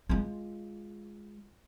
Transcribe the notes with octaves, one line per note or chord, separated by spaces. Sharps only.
G#3 F4